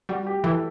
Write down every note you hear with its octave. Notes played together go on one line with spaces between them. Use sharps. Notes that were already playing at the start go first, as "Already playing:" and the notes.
G3 F#4
G4
E3 A4